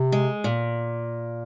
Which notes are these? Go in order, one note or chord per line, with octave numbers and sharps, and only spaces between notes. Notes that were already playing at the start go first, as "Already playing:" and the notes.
Already playing: C3
G#3
A#2